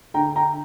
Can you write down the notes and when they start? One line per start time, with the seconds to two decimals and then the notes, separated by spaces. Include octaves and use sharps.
0.14 D3 G5 A#5
0.36 G5 A#5